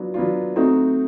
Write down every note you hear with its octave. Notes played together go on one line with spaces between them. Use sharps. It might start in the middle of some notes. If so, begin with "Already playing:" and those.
Already playing: F#3 B3 D4 F4
F#3 B3 D4 F4
A3 C4 D#4 F#4